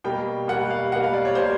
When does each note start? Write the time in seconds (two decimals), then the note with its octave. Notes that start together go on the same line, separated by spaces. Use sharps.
0.04 B2 G3 A#3 G5
0.48 B2 G3 A#3 F#5
0.70 F5
0.92 B2 G3 A#3 F#5
1.03 F5
1.13 D5
1.25 C#5
1.35 B2 G3 A#3 C5